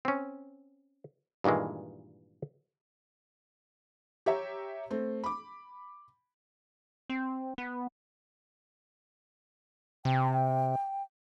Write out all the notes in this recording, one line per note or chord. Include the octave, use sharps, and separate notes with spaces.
C4 C#4
G2 A#2 D#3 E3 G#3
G4 C#5 E5 A#5
A3 C4
B5 D6
C4
B3
C3 G5